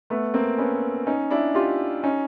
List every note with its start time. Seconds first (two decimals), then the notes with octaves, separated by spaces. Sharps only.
0.10 A3 B3
0.34 A#3 C4
0.58 B3 C#4
1.07 C#4 D#4
1.31 D4 E4
1.54 F4 G4
2.03 C#4 D#4